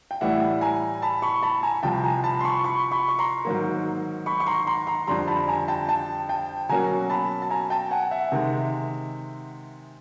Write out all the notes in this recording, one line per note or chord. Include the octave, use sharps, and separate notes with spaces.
G5
A2 E3 G3 E5 F#5
G#5 A#5
A5 B5
B5 C#6
A5 B5
G#5 A#5
C2 C3 F3 G5 A5
G#5 A#5
A5 B5
C6
B5 C#6
B5 C#6
B5 C#6
C#6
A#5 C6
G#2 D#3 F#3 A#3
B5 C#6
C#6
A#5 C6
A#5 C6
A#5 C6
F2 D3 G3 A#5 C6
A5 B5
G#5 A#5
G5 A5
G5 A5
G5 A5
B2 F#3 A#3 C#4 G#5 A#5
A5 B5
A5
G#5 A#5
G5 A5
F#5 G#5
E5 F#5
C3 D#3 G#3